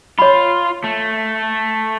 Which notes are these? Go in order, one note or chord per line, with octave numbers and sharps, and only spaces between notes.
F4 C#5 B5
A3